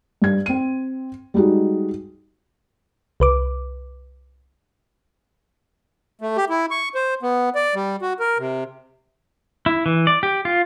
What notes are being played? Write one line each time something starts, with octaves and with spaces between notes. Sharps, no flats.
G2 G#6
C4 D#7
G3 G#3 D#4 F#4
C2 B4 D6
A3
G4
E4
C#6
C5
B3
D5
G3
F#4
A#4
C3
E4
E3
D5
G4
F4